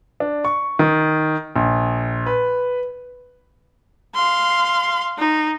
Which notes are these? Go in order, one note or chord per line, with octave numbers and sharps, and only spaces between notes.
D4
C#6
D#3
A#1
B4
F5 C6
D#4